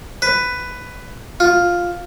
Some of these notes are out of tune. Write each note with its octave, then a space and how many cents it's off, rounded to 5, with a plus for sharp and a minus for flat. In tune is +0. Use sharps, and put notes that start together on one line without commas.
B4 +10
F4 +5